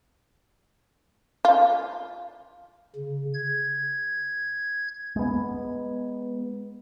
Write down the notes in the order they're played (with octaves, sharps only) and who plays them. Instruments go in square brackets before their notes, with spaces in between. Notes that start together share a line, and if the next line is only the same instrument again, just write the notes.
[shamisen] F4
[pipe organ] C#3
G#6
[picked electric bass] G#3 B3